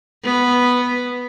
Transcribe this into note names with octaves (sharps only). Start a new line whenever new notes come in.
B3